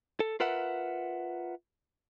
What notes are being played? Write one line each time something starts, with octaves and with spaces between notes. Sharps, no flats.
A4
F4 A#4 B4 E5 F#5